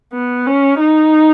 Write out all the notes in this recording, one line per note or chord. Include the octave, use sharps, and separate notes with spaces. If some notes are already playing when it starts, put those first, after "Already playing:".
B3
C#4
D#4